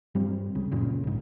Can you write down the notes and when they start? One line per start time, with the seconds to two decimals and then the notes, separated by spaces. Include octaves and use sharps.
0.15 G2 G3 C4
0.55 C#2 C#3
0.71 F#2 A#2 C#3
1.04 B1 G#2